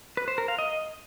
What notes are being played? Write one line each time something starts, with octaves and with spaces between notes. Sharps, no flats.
B4
C5
A#4
F5
D#5